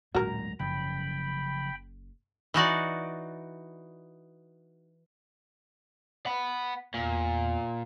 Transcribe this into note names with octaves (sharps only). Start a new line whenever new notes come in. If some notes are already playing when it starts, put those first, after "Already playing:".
A1 D2 A#2 F#3 G#3 F#4 A#4 A#5
F#1 C#3 F3 F#3 G5 B5
E3 D#4 F#4 D5
F#5 B5
E2 A#2